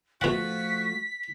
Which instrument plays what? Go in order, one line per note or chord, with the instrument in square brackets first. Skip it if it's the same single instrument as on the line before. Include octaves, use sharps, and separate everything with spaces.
[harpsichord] B2 F#5 [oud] F3 A3 [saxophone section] F#4 [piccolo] B6